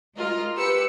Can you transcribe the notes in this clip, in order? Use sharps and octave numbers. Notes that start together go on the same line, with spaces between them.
G#3 F4 A#4 D#5
G4 B4 E6 C#7